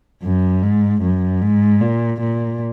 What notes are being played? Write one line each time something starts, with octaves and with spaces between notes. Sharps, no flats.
F#2
G#2
F#2
G#2
A#2
A#2